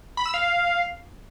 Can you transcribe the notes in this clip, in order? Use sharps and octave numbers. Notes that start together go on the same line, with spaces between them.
B5
E6
F5